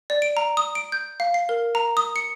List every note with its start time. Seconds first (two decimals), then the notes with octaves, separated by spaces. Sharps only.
0.10 D5
0.22 D7
0.37 A#5
0.57 D#6
0.75 D7
0.92 G6
1.20 F5
1.34 C7
1.49 A#4
1.75 A#5
1.97 D#6
2.16 C#7